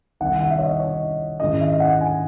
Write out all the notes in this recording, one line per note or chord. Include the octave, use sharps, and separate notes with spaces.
C2 C3 D#3 F#5
F#5
E5
C#5
D#5
C#5
G#2 D#3 G#3 C#4 E4 D#5
E5
F#5
G#5